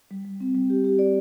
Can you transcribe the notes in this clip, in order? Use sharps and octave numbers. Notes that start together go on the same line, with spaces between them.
G3
G3
C4
G3
G4
G4
D5